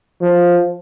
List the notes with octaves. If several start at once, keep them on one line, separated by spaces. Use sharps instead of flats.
F3